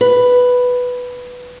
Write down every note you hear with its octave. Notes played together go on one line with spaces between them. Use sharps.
B4